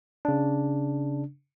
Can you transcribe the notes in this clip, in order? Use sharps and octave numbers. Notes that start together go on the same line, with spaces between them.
C#3 D4